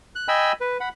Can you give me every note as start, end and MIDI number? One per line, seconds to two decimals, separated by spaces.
0.15 0.28 90
0.28 0.52 75
0.28 0.52 79
0.28 0.52 80
0.28 0.52 83
0.28 0.52 88
0.61 0.77 71
0.80 0.89 78
0.80 0.89 83